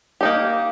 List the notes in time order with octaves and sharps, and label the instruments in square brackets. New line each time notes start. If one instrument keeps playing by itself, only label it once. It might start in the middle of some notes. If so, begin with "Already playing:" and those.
[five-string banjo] A#3 D#4 G4